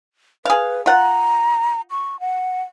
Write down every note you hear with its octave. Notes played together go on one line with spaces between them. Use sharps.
G#4 B4 F5
F4 F#5 A#5
C#6
F#5